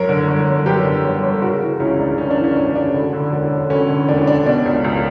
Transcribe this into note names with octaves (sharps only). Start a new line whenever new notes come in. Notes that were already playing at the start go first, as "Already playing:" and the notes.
Already playing: F#2 A#4 C#5
D3
G1
G1
F#2 G4 B4
D3
G1
G1
C#3 F#4 A#4
E3
C#2 C#4 E4
C#2 D4
C#3 C#4
D4
E3
C#4
C#2 D4
C#4
C#2 D4
D2
D3
E1
E1
D2 C#4
D3
E1 D4
C#4
E1 D4
B2 D4
C#2
C#2